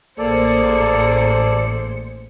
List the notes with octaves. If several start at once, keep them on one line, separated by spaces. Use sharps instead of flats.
A1 A#3 G#4 A4 C5 D5 C#7